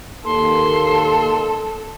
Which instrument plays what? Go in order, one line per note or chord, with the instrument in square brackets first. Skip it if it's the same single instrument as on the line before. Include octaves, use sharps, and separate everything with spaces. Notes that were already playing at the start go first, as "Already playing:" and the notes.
[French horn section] D#2 A#3 [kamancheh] A4 [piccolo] C6